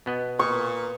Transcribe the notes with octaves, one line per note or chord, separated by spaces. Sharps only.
B2 B3 D#5
A#2 B4 C#6 D#6